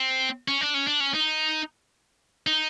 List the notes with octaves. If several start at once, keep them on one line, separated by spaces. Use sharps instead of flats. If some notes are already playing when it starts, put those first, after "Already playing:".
Already playing: C4
C#4
D4
C#4
D4
C#4
D#4
D#4